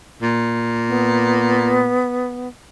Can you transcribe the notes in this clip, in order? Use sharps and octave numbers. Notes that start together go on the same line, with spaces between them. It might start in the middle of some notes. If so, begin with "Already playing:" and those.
A#2
B3